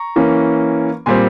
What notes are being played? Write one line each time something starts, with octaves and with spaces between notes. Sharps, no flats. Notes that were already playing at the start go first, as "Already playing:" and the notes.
Already playing: A#5 C#6
E3 A#3 C#4
A#2 G3 C4 G#5 C6